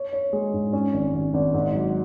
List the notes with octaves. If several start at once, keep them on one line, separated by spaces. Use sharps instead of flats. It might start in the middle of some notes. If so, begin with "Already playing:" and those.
Already playing: C#5
C#5
G#3
G#2
C#4
G#1
G#1
G#1
G#2
F#3